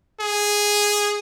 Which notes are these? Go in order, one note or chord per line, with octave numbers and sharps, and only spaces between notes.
G#4